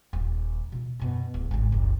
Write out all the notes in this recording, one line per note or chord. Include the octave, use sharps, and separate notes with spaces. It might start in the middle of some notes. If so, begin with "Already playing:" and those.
D#1
B2 F4
F#2 B2
D1
G#1 D2
F#1 C2